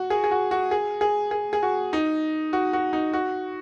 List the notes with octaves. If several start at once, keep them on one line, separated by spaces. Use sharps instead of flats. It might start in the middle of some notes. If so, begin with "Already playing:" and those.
Already playing: F#4
G#4
G#4
F#4
F#4
G#4
G#4
G#4
G#4
F#4
D#4
F#4
F#4
D#4
F#4